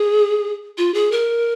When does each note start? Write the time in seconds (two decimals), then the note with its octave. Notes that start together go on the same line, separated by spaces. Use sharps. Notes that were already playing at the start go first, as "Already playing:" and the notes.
Already playing: G#4
0.78 F4
0.94 G#4
1.12 A#4